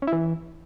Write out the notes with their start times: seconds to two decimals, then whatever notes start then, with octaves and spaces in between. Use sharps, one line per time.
0.02 C#4
0.07 E4
0.13 E3